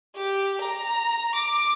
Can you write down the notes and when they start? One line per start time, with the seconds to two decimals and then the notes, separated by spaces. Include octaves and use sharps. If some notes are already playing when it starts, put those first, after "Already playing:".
0.16 G4
0.61 A#5
1.35 D6